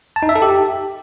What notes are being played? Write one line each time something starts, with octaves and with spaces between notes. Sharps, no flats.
A5
D#4
E5
A4
G4